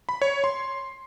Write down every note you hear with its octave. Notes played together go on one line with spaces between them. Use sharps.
B5
C#5
C6